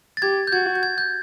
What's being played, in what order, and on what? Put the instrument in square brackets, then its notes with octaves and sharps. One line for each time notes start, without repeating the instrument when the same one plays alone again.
[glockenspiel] A6
[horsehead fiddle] G4 [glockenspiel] G#6
[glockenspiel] G6
[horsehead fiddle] F#4 [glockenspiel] G#6
[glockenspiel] G6
G#6
G6